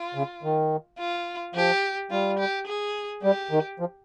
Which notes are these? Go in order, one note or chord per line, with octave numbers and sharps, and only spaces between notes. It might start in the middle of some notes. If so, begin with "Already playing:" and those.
Already playing: F4
C#3
D#3
F4
F3 G4
G3 F4
G4
G#4
G3 G4
D#3
F3